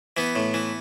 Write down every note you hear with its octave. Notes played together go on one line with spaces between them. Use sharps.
E3 B3
A2
E3